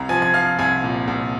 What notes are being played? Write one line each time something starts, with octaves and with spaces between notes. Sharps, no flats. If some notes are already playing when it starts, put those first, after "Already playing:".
Already playing: C2 A#5
F3 G#5 G#6
G#6
F3 F5 F6
C2 G#5 G#6
A#2
C2